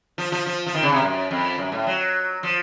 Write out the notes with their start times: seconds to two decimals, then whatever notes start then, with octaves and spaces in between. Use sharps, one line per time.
0.18 F3
0.32 F3
0.46 F3
0.66 F3
0.75 D#3
0.83 C#3
0.92 C3
1.02 F#2
1.31 F2
1.58 F#2
1.72 A2
1.87 F#3
2.43 F3